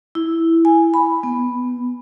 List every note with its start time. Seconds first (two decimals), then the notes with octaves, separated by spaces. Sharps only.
0.15 E4
0.65 G#5
0.94 B5
1.23 B3